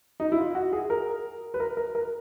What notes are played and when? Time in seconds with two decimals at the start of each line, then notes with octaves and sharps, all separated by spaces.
0.20 D#4
0.32 E4
0.38 F4
0.55 F#4
0.73 G#4
0.90 A#4
1.54 B4
1.60 A#4
1.77 A#4
1.95 A#4